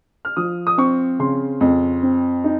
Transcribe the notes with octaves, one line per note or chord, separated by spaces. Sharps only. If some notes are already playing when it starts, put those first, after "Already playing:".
F6
F3 D#6
D#6
C4 C#6
C#3 C6
F2
C4
D#4